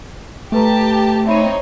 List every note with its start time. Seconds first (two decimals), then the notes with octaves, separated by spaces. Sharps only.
0.52 A3 G4 A4 B4 A5 A#5
1.27 C4 D#4 C#5 E5 B5 D#7